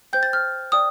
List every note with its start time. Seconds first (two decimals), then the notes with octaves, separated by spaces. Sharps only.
0.13 C5 G5 G6
0.23 A6
0.33 F6
0.72 D5 G5 D#6